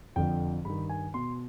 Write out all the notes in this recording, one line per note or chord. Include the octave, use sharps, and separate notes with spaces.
F2 D3 F3 G5
G2 D#3 B5
G#5
B2 C6